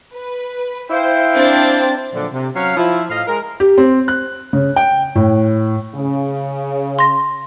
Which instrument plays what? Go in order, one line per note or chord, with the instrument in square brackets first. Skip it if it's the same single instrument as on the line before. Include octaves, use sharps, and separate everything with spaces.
[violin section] B4
[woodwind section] E4 F5 G5 [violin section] C5
[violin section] C4 D4 A6
[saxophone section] A#2 D3 F3 F#3 D4
C3
F#3 C#4 C#5 F5
F3 E4
A2 D#5 F5
G#3 A#4
[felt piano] G4
C4
F#6
C#3
G5
A2
[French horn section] C#3
[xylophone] C6 A#6